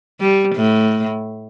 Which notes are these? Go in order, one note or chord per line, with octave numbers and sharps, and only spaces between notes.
G3
A2